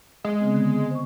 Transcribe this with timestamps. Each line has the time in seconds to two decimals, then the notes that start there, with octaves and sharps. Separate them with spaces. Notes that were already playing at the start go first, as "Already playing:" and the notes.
0.25 G#3
0.40 C#3 B3 C4
0.54 D3 B3
0.91 C5 C#6